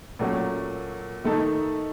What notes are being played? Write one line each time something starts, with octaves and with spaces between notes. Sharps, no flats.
A#2 F#3 A3 C#4 F#4
D#3 A3 D#4 A4